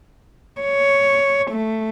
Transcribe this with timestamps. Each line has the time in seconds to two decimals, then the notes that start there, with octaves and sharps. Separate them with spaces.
0.61 C#5
1.51 A3